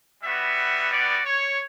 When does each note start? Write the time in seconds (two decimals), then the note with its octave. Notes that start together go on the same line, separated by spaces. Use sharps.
0.23 G3 B3 F#4 E5
0.91 D5
1.25 C#5